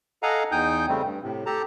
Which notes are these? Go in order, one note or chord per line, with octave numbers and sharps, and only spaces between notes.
A4 D#5 F5 F#5 G#5 A#5
E2 D#4 G5 G#5 D#6 G6
C#3 G3 A3 C4
G2
A2 C3
G4 A4 A5 A#5